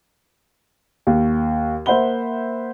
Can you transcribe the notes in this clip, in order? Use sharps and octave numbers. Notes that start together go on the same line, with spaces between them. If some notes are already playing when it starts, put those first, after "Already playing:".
D#2
A#3 C5 E5 F#5 B5 G7